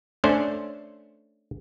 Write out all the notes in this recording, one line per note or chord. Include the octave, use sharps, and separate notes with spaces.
A3 C#4 D4 C5